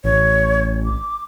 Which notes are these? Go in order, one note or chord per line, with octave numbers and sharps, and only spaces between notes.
A1 C#5
D6